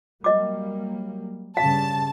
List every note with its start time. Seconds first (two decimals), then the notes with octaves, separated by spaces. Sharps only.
0.24 F#3 G3 A#3 D#5 D6
1.57 G2 C#3 G3 F5 A5